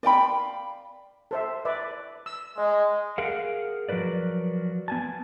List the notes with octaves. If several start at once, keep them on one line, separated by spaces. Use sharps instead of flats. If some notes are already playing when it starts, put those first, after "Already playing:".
D5 F5 G5 B5
A4 C5 E5
B4 D5 E5
E6
G#3 D#5
G#4 A#4 F5 F#5
F3 F#3 A#4 B4 D5
B3 G#5 A5